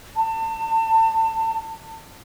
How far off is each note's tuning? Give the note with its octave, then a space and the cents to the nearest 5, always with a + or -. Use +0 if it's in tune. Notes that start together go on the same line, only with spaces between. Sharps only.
A5 +30